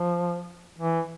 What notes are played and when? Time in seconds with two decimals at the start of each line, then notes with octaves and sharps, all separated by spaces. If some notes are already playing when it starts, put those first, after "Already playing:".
Already playing: F3
0.78 E3